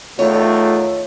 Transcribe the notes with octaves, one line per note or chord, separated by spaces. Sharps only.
E2 D#3 A3 F4 C#5